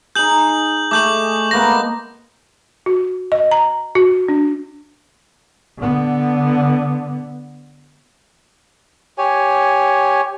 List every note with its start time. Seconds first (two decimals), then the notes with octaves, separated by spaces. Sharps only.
0.15 D#4 G#4 G6 F#7
0.91 A3 G#4 D6 G6 F#7
1.51 G#3 A#3 B3 A#6
2.86 F#4
3.32 D#5
3.51 A#5
3.95 F#4
4.28 D4
5.78 D3 B3
9.18 G4 C#5 G#5